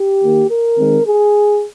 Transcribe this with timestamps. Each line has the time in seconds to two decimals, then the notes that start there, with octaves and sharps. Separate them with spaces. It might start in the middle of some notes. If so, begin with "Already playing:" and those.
Already playing: G4
0.21 D#3 A#3
0.49 A#4
0.77 D#3 G#3 C4
1.06 G#4